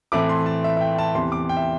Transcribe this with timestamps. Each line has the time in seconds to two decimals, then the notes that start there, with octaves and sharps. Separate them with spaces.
0.12 A2 E3 A3 C4 E4 D6
0.29 C6
0.46 A5
0.64 E5
0.77 E5
0.81 G5
0.98 A5
1.15 E2 C3 E3 C6
1.32 D6
1.49 G5
1.57 E5